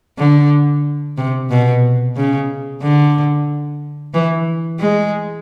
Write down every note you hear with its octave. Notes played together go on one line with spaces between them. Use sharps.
D3
C3
B2
C#3
D3
E3
G#3